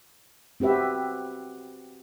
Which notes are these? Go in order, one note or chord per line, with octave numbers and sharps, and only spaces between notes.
C4 F#4 G4 B4 E5